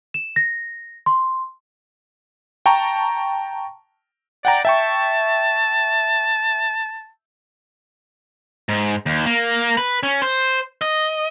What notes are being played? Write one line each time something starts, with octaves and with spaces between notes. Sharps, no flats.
E7
A#6
C6
G5 A5 A#5 C#6
D5 F#5 G5 A#5
E5 G5 A5 C#6
G#2
D#2
A#3
B4
C#4
C5
D#5